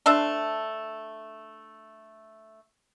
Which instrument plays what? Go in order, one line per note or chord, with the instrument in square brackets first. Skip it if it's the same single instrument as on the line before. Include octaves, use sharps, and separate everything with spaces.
[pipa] A3 D4 C5 E5